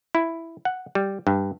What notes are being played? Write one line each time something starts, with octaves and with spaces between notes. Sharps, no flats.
E4
F#5
G3
G2